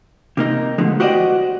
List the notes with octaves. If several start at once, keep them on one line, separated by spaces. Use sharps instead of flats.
C3 A#3 D#4
B2 D3 F3 G#3 A3
F#4 G4 C5 D5 D#5 F#5